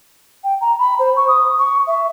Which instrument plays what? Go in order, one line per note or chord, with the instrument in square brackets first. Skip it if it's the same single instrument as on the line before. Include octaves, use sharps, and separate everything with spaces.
[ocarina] G5
A#5
B5
C5
C#6
D#6
C#6
E5